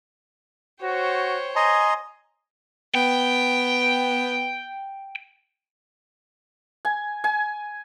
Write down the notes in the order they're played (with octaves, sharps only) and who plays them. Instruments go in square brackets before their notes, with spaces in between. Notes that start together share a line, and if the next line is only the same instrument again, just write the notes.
[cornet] F#4 [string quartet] C5 C#5 G5
[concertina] D#5 A#5 C6 [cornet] G#5
[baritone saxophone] B3 [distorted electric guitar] G5
[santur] G#5
G#5